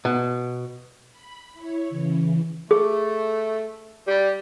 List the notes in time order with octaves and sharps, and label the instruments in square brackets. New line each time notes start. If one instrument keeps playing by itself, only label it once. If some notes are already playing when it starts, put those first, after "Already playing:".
[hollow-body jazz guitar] B2
[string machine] B5
E4 C#5
C#3 E3
[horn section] A3 [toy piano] G#4
[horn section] G3